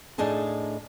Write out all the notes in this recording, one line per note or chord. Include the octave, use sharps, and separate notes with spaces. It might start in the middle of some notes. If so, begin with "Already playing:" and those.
A2 D4 D#4 G#4 A5